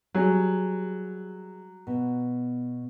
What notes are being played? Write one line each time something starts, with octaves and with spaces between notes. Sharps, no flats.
F#3 G3 G#4
B2